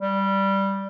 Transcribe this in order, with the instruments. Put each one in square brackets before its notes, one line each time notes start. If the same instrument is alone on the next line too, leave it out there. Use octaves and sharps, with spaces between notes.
[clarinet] G3